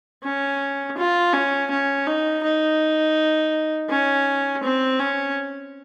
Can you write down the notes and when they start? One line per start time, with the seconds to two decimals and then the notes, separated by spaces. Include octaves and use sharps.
0.24 C#4
0.98 F4
1.33 C#4
1.71 C#4
2.07 D#4
2.43 D#4
3.90 C#4
4.63 C4
4.99 C#4